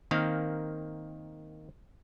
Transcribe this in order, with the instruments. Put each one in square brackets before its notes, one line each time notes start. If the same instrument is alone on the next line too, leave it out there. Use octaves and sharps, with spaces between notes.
[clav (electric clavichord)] D#3 A#3 C4 F5